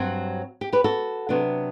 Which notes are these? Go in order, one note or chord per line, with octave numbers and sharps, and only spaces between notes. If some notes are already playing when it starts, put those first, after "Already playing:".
Already playing: G2 F#3 C4 F#4
G4
G4 B4
F#4 A4
C3 F#3 B3 D4